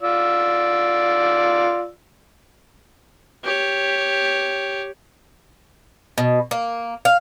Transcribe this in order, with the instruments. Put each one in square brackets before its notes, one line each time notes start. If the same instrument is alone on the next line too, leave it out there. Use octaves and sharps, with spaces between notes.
[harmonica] F4 D5 E6
[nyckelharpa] G4 C#5
[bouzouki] B2
A#3
F5